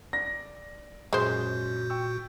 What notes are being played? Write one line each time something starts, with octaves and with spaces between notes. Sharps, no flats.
D5 A#6
F#2 A#2 G#3 F#4 C5 G6
G5 C#6 E6